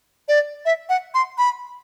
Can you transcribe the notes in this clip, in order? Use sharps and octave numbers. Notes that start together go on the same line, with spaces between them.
D5
E5
F#5
C6
B5